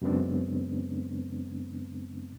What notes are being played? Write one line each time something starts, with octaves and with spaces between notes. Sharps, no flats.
F#2 C#3 G#3 B3 C4 D4